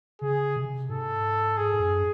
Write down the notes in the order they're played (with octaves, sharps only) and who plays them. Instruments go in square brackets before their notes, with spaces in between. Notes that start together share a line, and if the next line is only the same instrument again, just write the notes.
[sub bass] C#3 [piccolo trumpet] G#4
[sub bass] C3
[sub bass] G#2 [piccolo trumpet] A4
[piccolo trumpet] G#4
[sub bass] G#2
F#2